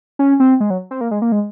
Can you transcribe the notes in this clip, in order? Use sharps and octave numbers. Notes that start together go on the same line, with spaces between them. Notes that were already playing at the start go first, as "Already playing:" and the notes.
C#4
C4
G#3
F#3
C4
A#3
G#3
A#3
G#3